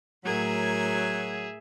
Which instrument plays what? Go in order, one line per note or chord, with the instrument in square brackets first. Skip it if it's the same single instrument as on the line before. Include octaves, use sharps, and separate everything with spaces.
[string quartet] A2 A#4 G#6 [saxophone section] F#3 [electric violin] G#4 E5